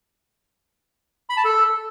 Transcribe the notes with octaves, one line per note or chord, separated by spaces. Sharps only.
B5
A5
A4